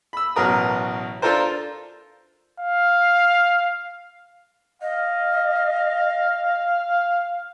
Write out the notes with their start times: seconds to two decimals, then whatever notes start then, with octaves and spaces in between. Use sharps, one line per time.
0.13 B5 E6
0.36 A1 B2 F#3 A#4 D#6
1.22 D4 F4 A4 A#4 C5
2.60 F5
4.82 D#5 F5